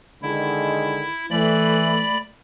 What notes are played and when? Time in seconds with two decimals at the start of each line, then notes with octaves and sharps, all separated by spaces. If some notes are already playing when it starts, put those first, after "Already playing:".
0.22 D3 D#3 G#3 E4
1.31 E3 A3 D5 B5